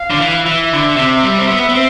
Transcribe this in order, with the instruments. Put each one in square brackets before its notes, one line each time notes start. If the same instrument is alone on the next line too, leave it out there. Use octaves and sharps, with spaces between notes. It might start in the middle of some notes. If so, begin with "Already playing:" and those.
Already playing: [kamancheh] F5
[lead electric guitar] D3
E3
[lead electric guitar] E3 [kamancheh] E5
[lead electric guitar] D3
C3
G3
C4
B3
B3
C4